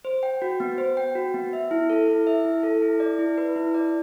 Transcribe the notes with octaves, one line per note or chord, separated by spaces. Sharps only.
C5
G5
F#4
B3
C5
G5
F#4
B3
E5
E4
A4
E4
E5
E4
A4
E4
D5
E4
B4
E4
D5